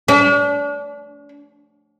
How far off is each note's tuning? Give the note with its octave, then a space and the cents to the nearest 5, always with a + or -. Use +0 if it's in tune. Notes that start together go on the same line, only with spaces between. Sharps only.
D4 -35